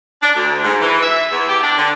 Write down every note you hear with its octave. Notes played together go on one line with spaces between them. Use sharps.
D4
D2
G#2
E3
E5
E2
G4
D4
D3